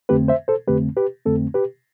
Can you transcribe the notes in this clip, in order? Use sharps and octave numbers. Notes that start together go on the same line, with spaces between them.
F2 D3 A3 C4 G4 B4
C5 E5
A4 C5
F2 D3 A3 C4 G4 B4
G4 B4
F2 D3 A3 C4 A4
G4 B4